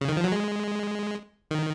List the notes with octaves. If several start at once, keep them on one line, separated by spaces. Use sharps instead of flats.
C#3
D#3
F3
F#3
G#3
D#3